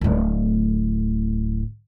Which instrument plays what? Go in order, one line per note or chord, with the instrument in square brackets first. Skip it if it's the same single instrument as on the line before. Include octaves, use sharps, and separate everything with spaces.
[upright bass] D1 A2